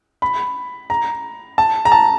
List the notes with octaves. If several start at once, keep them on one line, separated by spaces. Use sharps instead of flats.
B5
A#5
A5
A#5
A5